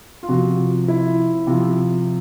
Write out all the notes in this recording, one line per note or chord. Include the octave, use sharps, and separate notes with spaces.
F4
C3 F3 F#4
E4
C3 F3